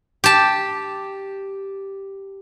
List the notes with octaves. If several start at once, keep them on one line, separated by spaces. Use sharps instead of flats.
G4 A5